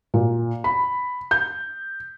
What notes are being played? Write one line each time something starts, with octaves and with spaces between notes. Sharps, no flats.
A#2
B5
G6